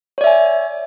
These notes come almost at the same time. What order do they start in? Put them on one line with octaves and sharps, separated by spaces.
C#5 D5 E5 G#5